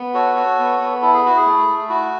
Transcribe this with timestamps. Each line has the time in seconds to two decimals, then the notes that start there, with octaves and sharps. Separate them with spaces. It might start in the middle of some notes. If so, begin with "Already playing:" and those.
Already playing: B3
0.14 F#4 A4 C#5
0.36 F#4
0.59 B3
0.80 B3
1.02 E4 A4
1.13 G#4
1.25 E4 F#4
1.37 G#4
1.47 A3
1.68 A3
1.89 E4 F#4